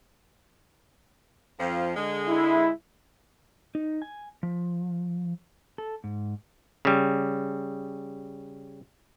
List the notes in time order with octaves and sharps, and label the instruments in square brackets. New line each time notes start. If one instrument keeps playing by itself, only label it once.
[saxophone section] F2 F3
D3 G#3
[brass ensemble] E4
[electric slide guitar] D#4
G#5
F3
A4
G#2
[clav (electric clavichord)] C#3 G3